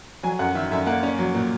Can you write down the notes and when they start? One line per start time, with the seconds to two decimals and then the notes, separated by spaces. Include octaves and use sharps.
0.23 F#3 G#5
0.39 F#2 F#5
0.55 D#3 E5
0.71 F#2 E5
0.86 A#3 F#5
1.03 C#4
1.19 F#3
1.35 A#2